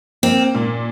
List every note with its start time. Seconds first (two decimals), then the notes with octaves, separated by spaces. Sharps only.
0.23 A#3 C4
0.55 A#2